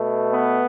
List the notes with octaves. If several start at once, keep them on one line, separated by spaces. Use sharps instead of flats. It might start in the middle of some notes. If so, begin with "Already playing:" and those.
Already playing: B2 A3
B3